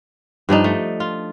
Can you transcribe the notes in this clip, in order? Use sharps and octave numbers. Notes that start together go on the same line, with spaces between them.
G2 F3 D4 D#4
A3
F4